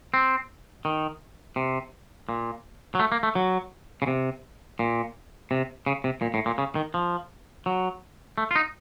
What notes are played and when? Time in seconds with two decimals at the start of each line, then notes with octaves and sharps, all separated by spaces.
0.14 C4
0.85 D#3
1.56 C3
2.29 A#2
2.95 F#3
2.99 A3
3.12 A#3
3.23 A3
3.35 F#3
4.02 C#3
4.07 C3
4.79 A#2
5.51 C3
5.86 C#3
6.04 C3
6.22 A#2
6.34 A2
6.46 A#2
6.58 C#3
6.75 D#3
6.94 F3
7.66 F#3
8.38 A3
8.51 F4
8.56 D#4